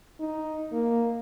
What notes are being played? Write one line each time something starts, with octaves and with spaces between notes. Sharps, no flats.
D#4
A#3